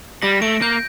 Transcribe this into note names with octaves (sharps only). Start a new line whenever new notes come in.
G3 A#6
A3 D7
A#3 G6